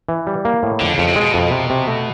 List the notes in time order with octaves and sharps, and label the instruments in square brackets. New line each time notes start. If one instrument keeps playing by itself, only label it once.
[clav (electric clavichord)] E3
G3
A#3
A2
[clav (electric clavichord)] F2 [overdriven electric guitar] D3
[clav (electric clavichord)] F2 [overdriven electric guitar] C#3
[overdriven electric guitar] C3
[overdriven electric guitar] B2 [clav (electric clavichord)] G#3
[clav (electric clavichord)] F2
C3
C3
A3